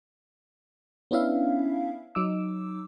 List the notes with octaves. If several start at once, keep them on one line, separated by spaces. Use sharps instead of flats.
B3 C#4 D4 E4 E5 F5
F#3 D#4 D6 E6